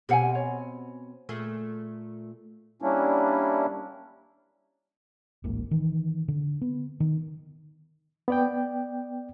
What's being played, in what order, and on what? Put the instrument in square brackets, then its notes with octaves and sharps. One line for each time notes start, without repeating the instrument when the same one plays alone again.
[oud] B2 C4 C#4 [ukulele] G4 F#5 G#5
[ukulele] C#5
[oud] A#2 A3 G#4
[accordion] G3 A#3 C#4 D4 E4
[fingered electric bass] D1 A1 G#2 A#3
D#3 E3
D3
B3
D#3
[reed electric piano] B3 D5 G5